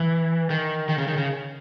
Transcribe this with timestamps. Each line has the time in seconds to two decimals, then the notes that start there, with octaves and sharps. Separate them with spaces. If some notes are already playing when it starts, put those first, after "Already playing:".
Already playing: E3
0.50 D#3
0.89 D#3
0.98 C#3
1.07 D#3
1.17 C#3